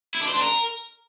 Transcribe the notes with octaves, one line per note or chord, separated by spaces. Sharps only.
E4
D4
C5
D4
A#4